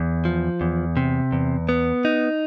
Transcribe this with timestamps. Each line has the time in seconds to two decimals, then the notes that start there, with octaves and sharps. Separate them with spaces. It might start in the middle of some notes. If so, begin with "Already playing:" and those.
Already playing: E2
0.25 F3
0.61 E2
0.97 C3
1.32 E2
1.69 B3
2.05 D#4